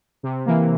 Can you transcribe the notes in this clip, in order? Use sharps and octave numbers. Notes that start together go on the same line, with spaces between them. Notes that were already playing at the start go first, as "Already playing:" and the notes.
C3
E3 A#3